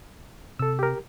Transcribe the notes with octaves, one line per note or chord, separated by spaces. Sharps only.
C3 A4 E6
G4 A#4